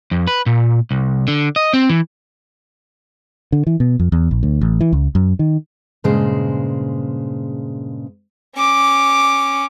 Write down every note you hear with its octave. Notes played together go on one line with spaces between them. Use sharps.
F2
B4
A#2
C2
D3
D#5
C4
E3
D3
E3
B2
F2
E2
A#1
D2
A1
E3
C#2
F#2
D#3
G2 A#2 C#3 G#3 C5
C#4 D6